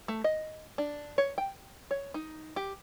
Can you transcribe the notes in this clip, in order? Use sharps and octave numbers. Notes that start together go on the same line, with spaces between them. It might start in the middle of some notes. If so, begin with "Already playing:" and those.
A3
D#5
D4
C#5
G5
C#5
D#4
G4